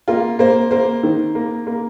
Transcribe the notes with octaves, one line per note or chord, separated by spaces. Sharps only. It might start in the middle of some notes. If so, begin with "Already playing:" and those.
A#3 F4
A#3 C5
A#3 C5
D#3
A#3
A#3